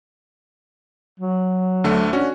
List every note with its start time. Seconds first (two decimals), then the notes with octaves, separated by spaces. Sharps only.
1.20 F#3
1.84 D2 D3 A3
2.13 C#4 D4 F#4